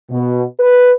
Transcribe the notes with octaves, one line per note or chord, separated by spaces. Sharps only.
B2
B4